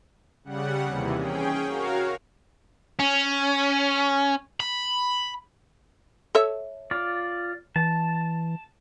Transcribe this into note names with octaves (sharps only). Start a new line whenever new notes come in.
C#3 G3 F#5
D#2 C3 E3
C#4 G#4 G5
F#4 A#4 C#5 F5
C#4
B5
A4 C#5 E5
F4 D5
E3 A5